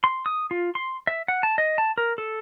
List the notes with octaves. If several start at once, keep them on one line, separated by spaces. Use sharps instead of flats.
C6
D#6
F4
C6
E5
F#5
A5
D#5
A5
A#4
A4